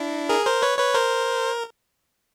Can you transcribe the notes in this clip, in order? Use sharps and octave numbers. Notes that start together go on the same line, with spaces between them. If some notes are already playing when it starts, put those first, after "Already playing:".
Already playing: D4 E4
G#4 A#4
A#4 C5
B4 C#5
B4 C#5
A#4 C5